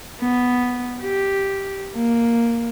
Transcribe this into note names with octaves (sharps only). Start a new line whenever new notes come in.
B3
G4
A#3